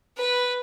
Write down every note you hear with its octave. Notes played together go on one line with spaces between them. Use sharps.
B4